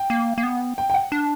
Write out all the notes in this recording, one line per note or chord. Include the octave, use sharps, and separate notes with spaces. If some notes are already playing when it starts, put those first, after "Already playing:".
Already playing: G5
A#3
A#3
B3
G5
G5
F#5
D4